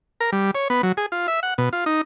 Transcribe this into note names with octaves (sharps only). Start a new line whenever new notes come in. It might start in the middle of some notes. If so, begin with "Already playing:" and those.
A#4
G3
C#5
B3
F#3
G#4
F4
E5
F#5
B2
F4
D#4